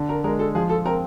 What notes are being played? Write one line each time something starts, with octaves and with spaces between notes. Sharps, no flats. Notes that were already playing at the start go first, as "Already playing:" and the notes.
Already playing: D3
A#4
G#3 A#4
A4
F3 G#4
A4
C4 A#4